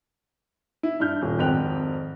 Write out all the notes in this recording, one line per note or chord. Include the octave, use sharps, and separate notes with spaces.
E4
G2 E4 F6 G6
D#1
G#1 F2 G5 F#6 F7